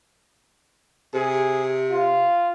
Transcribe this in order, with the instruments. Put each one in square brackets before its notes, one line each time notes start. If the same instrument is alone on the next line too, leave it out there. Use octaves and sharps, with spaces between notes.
[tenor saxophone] C3 [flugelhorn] G#4
[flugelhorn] F4